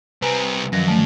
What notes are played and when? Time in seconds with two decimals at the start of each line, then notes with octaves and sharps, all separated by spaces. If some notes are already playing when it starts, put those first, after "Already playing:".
0.22 C2 C4 B4 G#5 A#5
0.73 F#2 D#3 F3 A#6
0.88 D3 A3